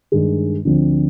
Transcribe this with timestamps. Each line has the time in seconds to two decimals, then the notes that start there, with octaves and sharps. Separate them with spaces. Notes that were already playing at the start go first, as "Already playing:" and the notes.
0.12 G2 D#3 G#3
0.65 D2 D3 F3 C4